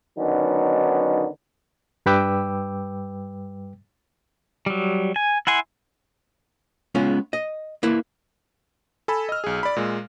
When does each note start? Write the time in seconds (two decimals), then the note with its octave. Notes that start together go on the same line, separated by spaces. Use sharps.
0.18 D3 D#3 F#3 B3 C#4 D#4
2.06 G2 G3 B4 G5 D6 E6
4.66 F#3 G3
5.16 G#5
5.47 E4 F#5 G#5 C6
6.95 G#3 B3 C#4 F4
7.33 D#5
7.83 A#3 E4 B4
9.08 A4 G#5 B5 E6
9.29 D#5 F6
9.44 B1 G#4
9.63 D5 B5
9.76 A#2 G#3